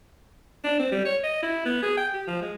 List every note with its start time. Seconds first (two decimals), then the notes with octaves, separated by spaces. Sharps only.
0.64 D4
0.79 C4
0.92 G3
1.05 C#5
1.24 D#5
1.43 E4
1.66 B3
1.83 G#4
1.97 G5
2.14 G4
2.27 F3
2.42 G#3